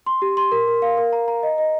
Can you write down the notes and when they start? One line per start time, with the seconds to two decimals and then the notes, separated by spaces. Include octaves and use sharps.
0.06 C6
0.22 G4
0.37 C6
0.52 A#4
0.67 A#4
0.82 F5
0.97 A#4
1.13 A#5
1.28 A#5
1.43 D#5
1.58 D#5